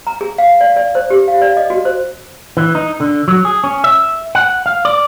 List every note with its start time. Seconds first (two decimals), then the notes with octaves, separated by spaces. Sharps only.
0.07 A#5
0.21 G#4
0.38 F5
0.61 D5
0.76 D5
0.95 C5
1.10 G4
1.28 F5
1.42 D5
1.57 D#5
1.70 F#4
1.85 C5
2.57 E3
2.75 D#4
3.00 D3
3.28 F#3
3.45 G#4
3.64 C#4
3.84 E5
4.35 F#5
4.66 F5
4.85 D5